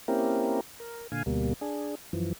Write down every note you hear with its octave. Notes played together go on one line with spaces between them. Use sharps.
A#3 C4 C#4 E4 G4 A#4
A#4
A#2 D3 F5 G#5
D2 B2 G3 A#3
D4 G#4
F#2 E3 F3